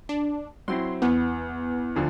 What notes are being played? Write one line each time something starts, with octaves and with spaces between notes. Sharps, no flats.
D4
F#3 C4 E4 C6
E2 B3
D2 D3 F3